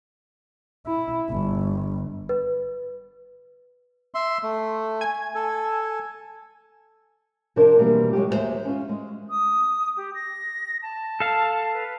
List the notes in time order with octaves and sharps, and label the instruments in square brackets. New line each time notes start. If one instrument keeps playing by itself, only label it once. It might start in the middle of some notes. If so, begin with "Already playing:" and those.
[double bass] E4
G1
[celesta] B4
[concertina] E5 C6
A3
[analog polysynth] G#5 G#6
[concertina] A4
[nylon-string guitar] C3 F3 C4 D4 A#4
B2 E3 F3 G3 A#3 C4
F#3 G#3 F4 G4
D#2 F#3 G#3 F#4 C5 E5
C#4 F4
G#3
[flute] D#6
G4
A#6
A5
[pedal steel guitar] A4 F5
[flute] B4